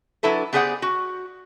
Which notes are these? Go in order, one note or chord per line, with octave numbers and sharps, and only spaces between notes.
F#3 D4 E4 A4 B4
B3 G4 G#4 C5 D5 F#5
F#4